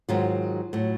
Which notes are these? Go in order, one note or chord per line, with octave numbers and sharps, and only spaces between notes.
G#2 D#3 F#3 F4
A2 F#3